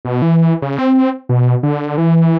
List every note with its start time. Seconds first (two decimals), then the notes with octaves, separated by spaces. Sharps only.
0.05 B2
0.22 E3
0.62 C#3
0.79 C4
1.29 B2
1.63 D3
1.98 E3